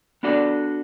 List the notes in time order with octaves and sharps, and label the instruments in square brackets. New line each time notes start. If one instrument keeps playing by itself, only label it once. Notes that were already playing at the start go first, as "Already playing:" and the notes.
[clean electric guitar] B3 D4 F#4 A4 D5